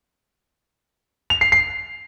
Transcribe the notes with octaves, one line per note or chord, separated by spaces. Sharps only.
F7
C7
C7